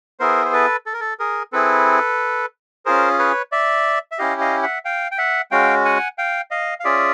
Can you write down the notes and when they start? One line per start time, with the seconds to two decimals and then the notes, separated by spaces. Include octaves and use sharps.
0.20 B3 E4 G#4 A#4 C5
0.46 C5
0.53 A4 B4
0.86 A4
0.93 A#4
1.00 A4
1.19 G#4 A#4
1.53 C4 E4 G#4 A4 B4
2.85 C#4 F4 G#4 A#4 C5
3.19 B4 C#5
3.52 D5 E5
4.12 E5
4.18 C#4 E4 G4 D#5 F5
4.41 D#5 F5
4.63 E5 F#5
4.85 F5 G5
5.11 G5
5.18 E5 F#5
5.51 G#3 C#4 F#4 F5 G5
5.85 F#5 G#5
6.18 F5 G5
6.51 D#5 F5
6.80 F5
6.84 C#4 F4 G#4 D5 E5